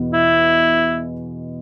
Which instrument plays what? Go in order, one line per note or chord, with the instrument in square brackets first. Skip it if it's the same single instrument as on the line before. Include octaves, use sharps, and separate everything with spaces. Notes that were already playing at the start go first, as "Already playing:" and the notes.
Already playing: [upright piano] E2 B2 B3 F#4
[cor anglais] E4